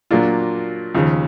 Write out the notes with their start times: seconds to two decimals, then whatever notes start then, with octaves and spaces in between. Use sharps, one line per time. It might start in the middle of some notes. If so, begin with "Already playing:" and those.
0.11 A#2 F#3 A#3 D4 F4
0.95 D#2 C#3 F3